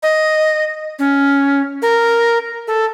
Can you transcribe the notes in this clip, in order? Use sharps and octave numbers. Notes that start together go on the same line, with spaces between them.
D#5
C#4
A#4
A4